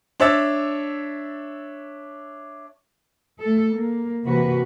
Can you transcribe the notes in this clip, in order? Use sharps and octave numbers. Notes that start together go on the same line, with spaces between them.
D4 C#5 E5 E6 A6
A3 A4
A#3
C3 E3 A#3 F#4 B4